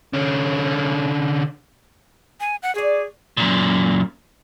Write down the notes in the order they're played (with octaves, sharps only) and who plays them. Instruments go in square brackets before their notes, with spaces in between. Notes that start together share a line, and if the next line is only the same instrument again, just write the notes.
[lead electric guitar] D3 C#4
[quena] G#5
F#5
[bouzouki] F#4 D5 [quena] G#4
[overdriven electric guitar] F#2 A#2